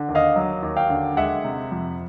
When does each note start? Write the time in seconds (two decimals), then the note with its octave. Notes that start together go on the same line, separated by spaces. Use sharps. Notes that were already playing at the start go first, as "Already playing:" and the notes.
Already playing: D3
0.09 D#2
0.15 D#5 F5
0.36 F#3
0.63 D#2
0.76 F5 G5
0.90 D3
1.17 G#3 E5 F#5
1.45 C3
1.72 F2